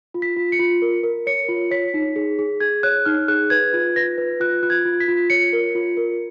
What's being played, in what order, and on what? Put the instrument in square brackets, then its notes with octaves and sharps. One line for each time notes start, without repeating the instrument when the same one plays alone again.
[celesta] F4
B6
F4
C#7
F4
A#4
A#4
C#5 C#7
F4
C#5 B6
D#4
G#4
G#4
G#4 G#6
C#5 F#6
D#4 F6
G#4 F#6
B4 G#6
F4
B4 A#6
B4
F4 F#6
F4 F#6
G#6
F4
B6
F4
C#5 C#7
A#4
F4
A#4